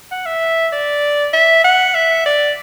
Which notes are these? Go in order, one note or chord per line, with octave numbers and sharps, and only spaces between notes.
F#5
E5
D5
E5
F#5
E5
D5